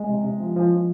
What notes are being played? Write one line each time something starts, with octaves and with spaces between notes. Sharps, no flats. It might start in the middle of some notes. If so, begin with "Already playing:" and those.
Already playing: G#3
C3
C3
F3
F3
F3